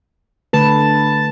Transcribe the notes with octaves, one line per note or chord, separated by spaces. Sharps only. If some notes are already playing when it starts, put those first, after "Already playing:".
D3 A3 B4 A5